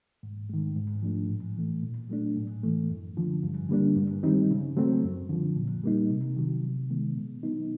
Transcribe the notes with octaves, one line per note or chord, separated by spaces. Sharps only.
G#2
D#3 G#3
G#2
F3 A3 D4
A2
E3 A3
A#2
F#3 A3 D4
A2
E3 A3
F#2
D3 F3
G2
D3 G3 A#3 D4
G2
D#3 G3 C4 D#4
C#3
F#3 A3 C4
F#2
D3 F3
A#2
G3 A#3 D#4
C3
D#3 F#3
C3
D#3 G#3 B3
B2
F#3 B3 D#4